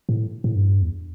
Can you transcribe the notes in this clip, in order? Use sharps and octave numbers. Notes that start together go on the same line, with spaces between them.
A2
A2
G2
E2